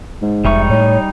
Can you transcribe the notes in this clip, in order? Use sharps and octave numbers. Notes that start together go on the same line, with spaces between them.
G#2
F1 G3 D#4 E5 C#6
A2 C#5